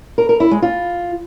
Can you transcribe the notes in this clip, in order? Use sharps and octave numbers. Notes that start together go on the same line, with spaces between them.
A#4
A#4
E4
G#3
F4